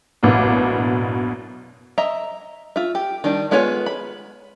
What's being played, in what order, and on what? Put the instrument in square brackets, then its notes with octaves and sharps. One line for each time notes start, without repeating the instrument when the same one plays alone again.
[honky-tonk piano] A1 F#2 B2 A#3 D4
[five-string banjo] D#5 E5 A#5
F4 E5
G4
D#3 G3 D4
G#3 B3 F4 C#5 G#5
B5